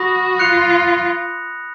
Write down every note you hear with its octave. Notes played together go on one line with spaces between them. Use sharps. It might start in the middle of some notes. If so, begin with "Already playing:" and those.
Already playing: F#4 B5 D#6 A#6
F4 F#6 C#7 F7